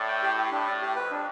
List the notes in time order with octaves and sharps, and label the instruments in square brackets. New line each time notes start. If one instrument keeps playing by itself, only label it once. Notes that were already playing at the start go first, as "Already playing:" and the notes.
Already playing: [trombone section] A2 [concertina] D5
[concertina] G5
G4
G4
[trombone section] A2 [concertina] D4
[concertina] D5
G4
[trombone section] F2 [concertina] B4
[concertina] D4